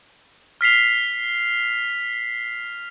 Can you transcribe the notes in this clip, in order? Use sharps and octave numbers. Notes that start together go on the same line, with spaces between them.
F6 B6 C7 F7